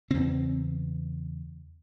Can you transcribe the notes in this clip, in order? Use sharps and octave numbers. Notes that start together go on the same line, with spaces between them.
E2 C#3 C4